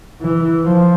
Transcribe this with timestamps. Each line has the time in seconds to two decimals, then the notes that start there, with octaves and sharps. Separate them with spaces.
0.21 E3
0.65 F3